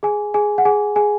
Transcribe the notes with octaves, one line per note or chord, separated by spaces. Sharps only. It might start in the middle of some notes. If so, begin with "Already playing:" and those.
G#4 G#5
G#4 G#5
F#5
G#4 G#5
G#4 G#5